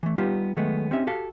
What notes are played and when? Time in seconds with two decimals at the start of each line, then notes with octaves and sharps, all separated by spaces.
0.03 E3 A3
0.18 G3 B3 D#4 F4 G4
0.57 D#3 F#3 G#3 A3 B3
0.91 C4 C#4 D#4 G4 E5
1.07 F#4 G4 A4 F5